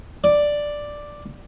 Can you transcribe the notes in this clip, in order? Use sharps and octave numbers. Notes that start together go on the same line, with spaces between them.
D5